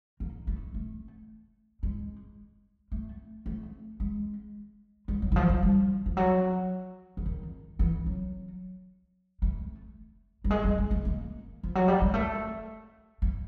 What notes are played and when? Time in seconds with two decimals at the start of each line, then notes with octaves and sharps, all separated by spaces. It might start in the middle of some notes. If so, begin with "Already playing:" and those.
0.20 A#3
0.47 A3
0.74 A3
1.83 G#3
2.92 A3
3.46 A3
4.00 G#3
5.08 G#3
5.22 F#3
5.32 E3
5.36 F3
5.49 F#3
5.63 G3
6.06 F3
6.17 F#3
7.17 E3
7.26 D#3
7.79 E3
8.06 F#3
9.42 A3
10.44 G3
10.50 G#3
10.64 G3
10.78 G#3
10.91 A3
11.05 A#3
11.63 F3
11.75 F#3
11.88 G3
12.01 G#3
12.14 A3
13.22 A#3